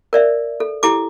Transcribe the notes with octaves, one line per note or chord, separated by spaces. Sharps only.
A#4 D5 E5
A4
E4 G4 A4 D6